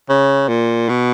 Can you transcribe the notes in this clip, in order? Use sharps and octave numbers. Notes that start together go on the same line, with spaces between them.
C#3
A#2
B2